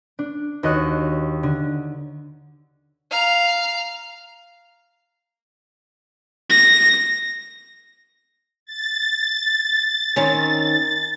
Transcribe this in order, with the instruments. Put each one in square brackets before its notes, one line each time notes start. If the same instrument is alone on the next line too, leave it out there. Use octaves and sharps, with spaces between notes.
[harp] D4
D#2 F#4 C#5 D#5 F#6
D3
[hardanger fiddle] F5 A#5
[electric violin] A#6
[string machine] A6
[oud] D#3 C4 C#4